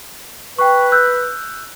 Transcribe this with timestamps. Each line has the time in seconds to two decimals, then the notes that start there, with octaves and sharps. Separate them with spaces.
0.58 B4 G5 C#6
0.92 E6 F#6 G6